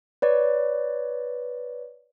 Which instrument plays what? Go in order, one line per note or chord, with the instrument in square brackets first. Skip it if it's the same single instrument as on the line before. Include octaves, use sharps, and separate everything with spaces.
[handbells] B4 C#5 D5